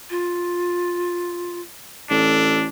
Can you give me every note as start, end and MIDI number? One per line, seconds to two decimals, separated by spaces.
0.10 1.60 65
2.10 2.68 33
2.10 2.67 62
2.10 2.58 69